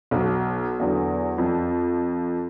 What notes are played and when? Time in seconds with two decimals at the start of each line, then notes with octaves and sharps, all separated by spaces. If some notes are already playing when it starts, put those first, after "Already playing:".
0.11 B1
0.79 E2 D3 F#3
1.38 F2